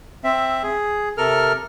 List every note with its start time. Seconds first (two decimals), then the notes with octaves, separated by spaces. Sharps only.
0.24 C4 E5
0.63 G#4
1.17 C3 A4 A#4 F6